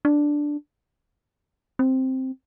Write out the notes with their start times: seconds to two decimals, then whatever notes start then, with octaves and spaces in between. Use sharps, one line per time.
0.05 D4
1.79 C4